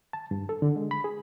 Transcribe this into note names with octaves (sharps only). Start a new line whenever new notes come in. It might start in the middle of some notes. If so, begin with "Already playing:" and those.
A5
G2
A4
D3
G#3
B5
G#4